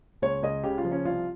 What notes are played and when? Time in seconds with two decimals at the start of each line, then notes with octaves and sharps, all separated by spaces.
0.22 C#2 C#5
0.43 C#2 D#5
0.63 C#3 G4
0.78 F4
0.85 F3
0.91 C#4
1.05 C2 F4